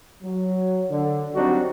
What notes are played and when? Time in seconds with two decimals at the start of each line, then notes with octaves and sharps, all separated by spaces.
0.23 F#3
0.90 D3
1.35 F#3 G3 C4 D4 D#4 F#4